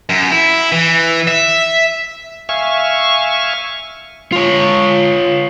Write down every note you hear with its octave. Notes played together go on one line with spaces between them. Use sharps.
F#2
E4
E3
E5
E5 F5 G#5 C#6
F4 C#5